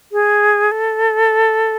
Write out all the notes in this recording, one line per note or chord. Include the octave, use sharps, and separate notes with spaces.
G#4
A4